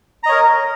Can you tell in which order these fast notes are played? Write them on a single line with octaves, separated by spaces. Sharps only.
A#5 D#5 C#5 A#4